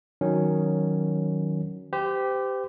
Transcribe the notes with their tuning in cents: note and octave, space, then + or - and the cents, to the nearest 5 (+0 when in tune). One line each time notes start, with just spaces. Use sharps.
D#3 +0 F#3 -5 C#4 +0
G4 +0 C5 -40